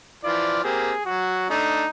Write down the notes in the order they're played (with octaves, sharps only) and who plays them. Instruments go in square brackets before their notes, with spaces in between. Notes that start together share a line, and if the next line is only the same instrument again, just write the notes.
[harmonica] E3 F3 F4 [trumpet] D5
[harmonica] A#3 C4 G4 [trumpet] G#4
[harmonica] F#3 [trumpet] F#4
[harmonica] A3 D4 [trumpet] D#4